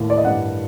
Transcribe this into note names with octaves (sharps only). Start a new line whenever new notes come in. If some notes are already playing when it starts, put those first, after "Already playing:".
Already playing: D#2 A2 A#3
D5
D#5
G2 F#5